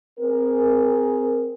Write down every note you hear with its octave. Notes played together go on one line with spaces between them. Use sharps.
C4 G#4 A#4